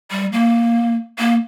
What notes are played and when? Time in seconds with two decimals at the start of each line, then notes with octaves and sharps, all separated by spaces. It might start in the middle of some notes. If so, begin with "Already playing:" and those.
0.11 G3
0.33 A#3
1.19 A#3